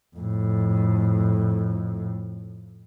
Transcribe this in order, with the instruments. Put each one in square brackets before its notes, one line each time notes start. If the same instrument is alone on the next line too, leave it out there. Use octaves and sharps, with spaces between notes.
[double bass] F2 A2